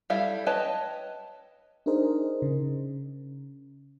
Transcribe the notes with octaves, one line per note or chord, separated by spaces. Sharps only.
G3 E4 A4 E5 F5
B4 C#5 D#5 G5 A5
D4 D#4 G#4 A#4 C5 D#5
C#3